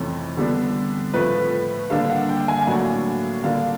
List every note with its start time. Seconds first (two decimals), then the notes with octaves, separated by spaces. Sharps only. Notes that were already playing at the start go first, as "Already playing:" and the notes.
Already playing: F2 C3 E3 A3 C#4
0.37 D3 G3 B3 D4
1.14 A2 F3 A3 B4
1.90 D3 G3 A#3 D4 F5
2.10 F#5
2.29 G5
2.48 G#5
2.67 A2 F#3 A#3 D4 F#5
3.43 D3 G3 A#3 D4 F5